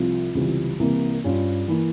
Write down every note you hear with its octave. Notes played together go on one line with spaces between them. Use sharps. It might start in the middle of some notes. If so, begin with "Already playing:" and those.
Already playing: C2 C3 F3 C4 F4
C#2 C3 E3 G3 C4
C2 C3 E3 A#3
G2 G3 C#4 F4
E3 A#3 E4